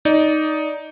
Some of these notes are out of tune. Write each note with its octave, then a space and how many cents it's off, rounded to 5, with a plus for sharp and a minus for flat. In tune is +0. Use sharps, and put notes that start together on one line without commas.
D#4 +0 D5 -20